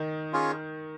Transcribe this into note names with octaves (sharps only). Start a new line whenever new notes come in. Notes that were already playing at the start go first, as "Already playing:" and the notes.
Already playing: D#3 D#4
C#4 F4 G#4 C#5